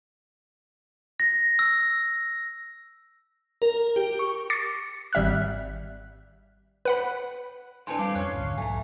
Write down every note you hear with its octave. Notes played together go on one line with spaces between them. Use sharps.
A#6
E6
A#4
G4
C#6
D6 A6 A#6 C7 C#7
G#1 G3 E5 F6 F#6
B4 F#5 B5
A2 C4 D4 B4 G#5 A5 C6
G3 F5 D6
F2 C#4 C#5 F#6
G#1 D2
B1 G#2 F#3 A3 G#5 A#5